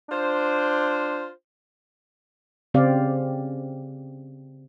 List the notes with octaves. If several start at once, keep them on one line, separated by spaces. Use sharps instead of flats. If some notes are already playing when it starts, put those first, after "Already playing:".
D4 F4 C5
C#3 C4 G4 D5 F5